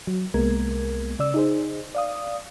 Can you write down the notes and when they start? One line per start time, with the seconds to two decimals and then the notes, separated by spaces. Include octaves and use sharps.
0.07 F#3
0.34 C2 G#3 A#3 B3 A#4 G#6
1.19 C#3 D5 E6
1.34 D#4 G#4 C5
1.95 D5 F5 D#6